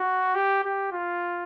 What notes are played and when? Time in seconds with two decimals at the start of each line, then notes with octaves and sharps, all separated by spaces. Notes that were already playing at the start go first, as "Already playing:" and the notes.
Already playing: F#4
0.35 G4
0.64 G4
0.92 F4